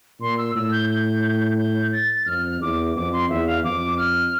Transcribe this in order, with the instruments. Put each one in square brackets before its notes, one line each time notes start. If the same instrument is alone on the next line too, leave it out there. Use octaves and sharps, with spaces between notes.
[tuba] A#2 [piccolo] C6
[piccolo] E6
[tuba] A2 [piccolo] E6
[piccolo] G6
G6
G6
A6
[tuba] F2 [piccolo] F6
[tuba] E2 [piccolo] D6
[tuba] F2 [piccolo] D6
[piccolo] C6
[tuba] E2 [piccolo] E5
[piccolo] F5
[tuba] F2 [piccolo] D6
[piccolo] F6